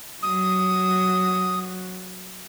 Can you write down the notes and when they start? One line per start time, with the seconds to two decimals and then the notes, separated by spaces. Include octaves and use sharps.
0.23 F#3 D#6